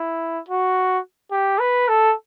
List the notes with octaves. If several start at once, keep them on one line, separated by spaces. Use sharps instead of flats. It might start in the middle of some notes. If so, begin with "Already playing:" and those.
Already playing: E4
F#4
G4
B4
A4